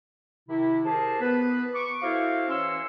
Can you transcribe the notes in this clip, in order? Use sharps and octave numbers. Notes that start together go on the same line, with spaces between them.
C3 D#3 E4
G4 G#4 A#4 C5 A5
B3 B4
C#6 D6
E4 F#4 A4 C5 E5 F5
E3 C#4 C#5 C6 E6